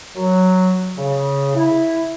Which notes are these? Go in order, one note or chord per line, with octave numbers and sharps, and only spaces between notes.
F#3
C#3
E4